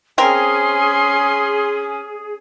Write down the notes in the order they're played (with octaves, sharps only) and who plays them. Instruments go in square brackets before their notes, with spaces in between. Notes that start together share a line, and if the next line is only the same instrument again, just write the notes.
[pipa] C4 A#4 [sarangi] C#4 [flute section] G#4 [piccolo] C6